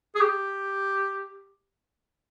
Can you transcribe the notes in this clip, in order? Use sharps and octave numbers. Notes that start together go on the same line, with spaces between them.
G#4
G4